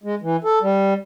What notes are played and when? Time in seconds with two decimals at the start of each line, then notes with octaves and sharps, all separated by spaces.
0.04 G#3
0.22 E3
0.44 A4
0.62 G3